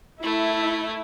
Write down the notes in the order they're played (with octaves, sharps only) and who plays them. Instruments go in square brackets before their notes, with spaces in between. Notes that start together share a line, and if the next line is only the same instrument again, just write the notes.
[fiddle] A3 [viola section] E4